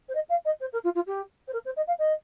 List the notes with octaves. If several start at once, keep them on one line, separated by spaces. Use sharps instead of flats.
C5
D#5
F5
D#5
C5
A#4
F4
F4
G4
C5
A#4
C5
D#5
F5
D#5